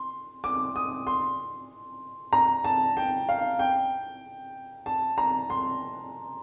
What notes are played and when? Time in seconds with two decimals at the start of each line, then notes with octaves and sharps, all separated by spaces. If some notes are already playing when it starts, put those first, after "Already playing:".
Already playing: C6
0.44 D6
0.76 D#6
1.07 C6
2.33 A#5
2.64 A5
2.97 G5
3.29 F5
3.59 G5
4.86 A5
5.18 A#5
5.50 C6